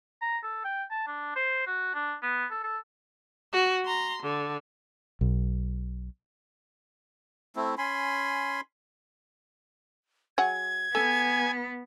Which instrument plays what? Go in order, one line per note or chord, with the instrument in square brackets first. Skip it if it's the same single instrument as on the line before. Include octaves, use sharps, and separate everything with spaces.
[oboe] A#5
A4
G5
A5
D4
C5
F#4
D4
B3
A4
A4
[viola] F#4
A#5 C6
D3
[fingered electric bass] B1
[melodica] A3 C4 E4
C#4 G#5 B5 C6
[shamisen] F#3 G#4 F#5 [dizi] G#6
[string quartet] B3 [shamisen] A4 [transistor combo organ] G#5